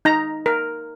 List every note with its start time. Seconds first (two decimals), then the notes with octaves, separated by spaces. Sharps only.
0.05 D#4 A#5
0.46 A#4